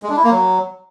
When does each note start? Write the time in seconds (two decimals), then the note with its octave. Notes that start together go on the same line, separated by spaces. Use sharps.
0.03 G#3
0.10 D4
0.17 E4
0.24 A#3
0.31 F#3